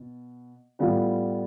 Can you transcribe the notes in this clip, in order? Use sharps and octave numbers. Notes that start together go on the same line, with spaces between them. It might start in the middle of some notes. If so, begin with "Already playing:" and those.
Already playing: B2
A2 G3 B3 F4